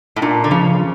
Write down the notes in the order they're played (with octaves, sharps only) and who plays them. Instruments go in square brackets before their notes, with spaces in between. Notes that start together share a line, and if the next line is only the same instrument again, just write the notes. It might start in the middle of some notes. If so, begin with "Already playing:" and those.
[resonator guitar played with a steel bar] A2
[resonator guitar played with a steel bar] A#2 [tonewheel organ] D4
[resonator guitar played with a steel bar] D3
[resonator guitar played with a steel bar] C#3 [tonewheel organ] F3